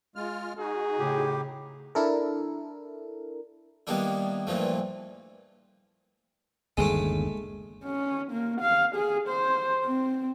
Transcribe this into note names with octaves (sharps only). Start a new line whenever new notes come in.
G#3 F4 F6
D#4 F#4 G#4
A2 C#3 G4
D4 E4 A4 A#4
D#3 G3 A#3 B3 D4 E4
G2 A#2 E3 F3 A3
G1 D#2 C#3 G#3 A3
C#4
A#3
F5
G#4
C5
C4